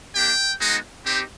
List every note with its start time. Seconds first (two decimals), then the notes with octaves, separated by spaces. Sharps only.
0.14 A#3 D4 G4 G5
0.59 G#3 B3 D#4 F#4
1.05 C4 D#4 G4